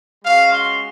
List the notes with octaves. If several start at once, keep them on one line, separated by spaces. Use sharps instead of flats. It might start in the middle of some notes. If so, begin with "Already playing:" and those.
G#3 C#4 F#4 F5
C6